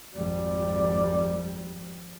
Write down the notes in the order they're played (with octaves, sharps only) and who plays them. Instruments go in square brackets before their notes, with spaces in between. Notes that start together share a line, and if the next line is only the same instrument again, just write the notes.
[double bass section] G#1 F2 G3 [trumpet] D5